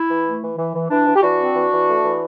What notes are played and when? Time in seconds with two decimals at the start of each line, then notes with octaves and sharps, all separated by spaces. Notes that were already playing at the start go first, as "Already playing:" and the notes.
Already playing: E4
0.09 E3
0.25 A3
0.42 E3
0.57 E3
0.74 E3
0.89 E3 D4
1.06 E3
1.15 G4
1.22 E3 D4 F#4
1.38 C4
1.55 E3
1.70 E3
1.87 A3
2.03 E3